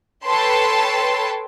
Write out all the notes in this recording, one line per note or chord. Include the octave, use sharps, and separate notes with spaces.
A4 B4 C#5 G5 A5 C6